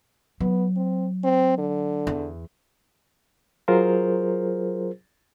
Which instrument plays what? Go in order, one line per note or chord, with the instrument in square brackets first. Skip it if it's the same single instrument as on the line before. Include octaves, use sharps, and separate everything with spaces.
[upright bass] F#3 [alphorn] B3
[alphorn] C4
C4
D3
[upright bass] E2
[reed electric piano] F#3 F4 G#4 A#4 C5